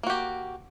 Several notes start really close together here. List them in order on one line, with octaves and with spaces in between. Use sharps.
A#3 F#4 G4